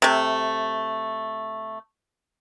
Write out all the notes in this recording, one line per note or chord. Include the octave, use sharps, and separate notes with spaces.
C3 A3